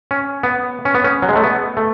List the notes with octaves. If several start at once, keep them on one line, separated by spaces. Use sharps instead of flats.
C#4
B3
C#4
B3
C#4
F#3
G#3
A3
B3
A3